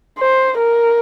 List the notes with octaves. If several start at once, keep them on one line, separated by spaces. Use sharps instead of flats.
C5
A#4